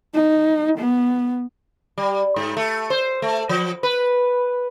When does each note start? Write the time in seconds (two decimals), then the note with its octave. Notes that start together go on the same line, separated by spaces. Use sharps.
0.14 D#4
0.78 B3
1.98 G3
2.36 G#2
2.57 A3
2.90 C5
3.22 A3
3.49 F3
3.83 B4